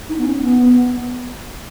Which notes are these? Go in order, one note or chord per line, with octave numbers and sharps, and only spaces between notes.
D#4
B3
C#4
B3